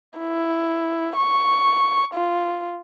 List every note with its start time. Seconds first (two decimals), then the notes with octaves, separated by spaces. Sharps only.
0.19 E4
1.17 C#6
2.15 F4